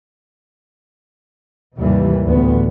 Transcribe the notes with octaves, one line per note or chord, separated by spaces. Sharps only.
D#2 G#2 C3 E3 G3
A1 D2 B3